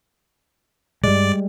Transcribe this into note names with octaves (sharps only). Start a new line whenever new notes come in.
G2 G3 G#3 D5